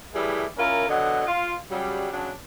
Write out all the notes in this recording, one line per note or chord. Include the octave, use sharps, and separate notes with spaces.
A2 E3 G3 E4 G#4
C#4 E4 F4 A#4
B2 D3 F#3 D#5 F#5
F4
C#3 F#3 G3
C#3 F#3 D4